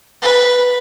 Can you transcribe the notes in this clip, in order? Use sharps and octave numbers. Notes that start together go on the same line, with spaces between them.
B4